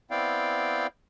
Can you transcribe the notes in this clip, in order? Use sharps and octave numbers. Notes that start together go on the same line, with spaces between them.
B3 C4 E4 D5 F5 G5